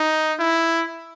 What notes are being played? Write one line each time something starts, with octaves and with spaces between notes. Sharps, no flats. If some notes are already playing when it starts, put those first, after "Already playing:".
Already playing: D#4
E4